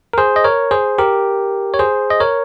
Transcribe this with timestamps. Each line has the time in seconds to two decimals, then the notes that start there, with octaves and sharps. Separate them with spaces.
0.13 A#4
0.18 G#4 C5
0.36 D#5
0.44 A#4 C#5
0.71 G#4 C5
0.98 G4 A#4
1.74 C#5
1.79 G#4 C5
2.10 D#5
2.20 A#4 C#5